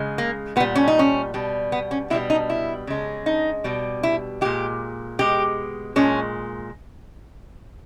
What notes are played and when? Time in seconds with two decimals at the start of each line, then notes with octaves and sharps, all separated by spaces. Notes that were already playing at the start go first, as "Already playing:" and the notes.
Already playing: C#3 G#3
0.18 A#3
0.56 A#2 B3
0.60 G3
0.76 C#4
0.88 D#4
0.99 C#4
1.34 B2 G3
1.72 B3
1.91 C#4
2.10 B2 E4
2.14 G3
2.30 D#4
2.50 E4
2.87 C#3 G#3
3.26 D#4
3.64 B2 G3
4.03 E4
4.41 A#2 G#3 G4
5.19 B2 G#3 G4
5.96 A#2 G#3 C#4